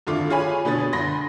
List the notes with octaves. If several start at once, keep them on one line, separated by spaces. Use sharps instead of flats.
G#1 D3 A3 F4 D6
F4 G#4 C#5 G#5 B5
B2 D3 C#4 D#6 A6
D2 B5 C6 A#6